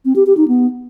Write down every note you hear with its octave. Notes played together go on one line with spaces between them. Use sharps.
C4
G4
G4
D#4
B3